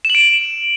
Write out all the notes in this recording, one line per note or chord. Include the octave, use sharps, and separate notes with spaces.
E7
F#7
D7